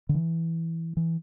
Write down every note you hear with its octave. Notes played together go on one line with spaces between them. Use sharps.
D3
E3
E3